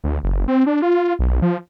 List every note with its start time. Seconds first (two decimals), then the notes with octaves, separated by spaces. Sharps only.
0.04 D2
0.23 F#1
0.48 C4
0.66 D4
0.82 F4
1.19 B1
1.42 F3